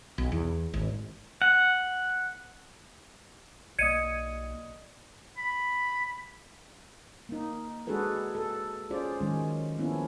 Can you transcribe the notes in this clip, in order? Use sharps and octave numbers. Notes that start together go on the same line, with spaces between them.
B1
E2
G#1
F#5
B1 A#3 D5 D#5 D#6 G#6 C#7 D#7
B5
A#3 D#4
G#3 D4 F#4 G#4 A4 B4
A4
C#4 F4 G#4 C5 D5
D#3 F#3 G#3 C#4
F3 A#3 B3 C#4 D4 E4